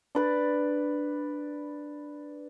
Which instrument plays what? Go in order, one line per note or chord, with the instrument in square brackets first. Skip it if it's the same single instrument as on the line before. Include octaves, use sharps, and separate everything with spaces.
[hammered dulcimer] D4 B4 D5